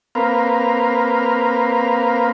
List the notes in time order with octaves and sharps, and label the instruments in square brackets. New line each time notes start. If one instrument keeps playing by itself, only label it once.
[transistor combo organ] A#3 C4 A#4 B4 F5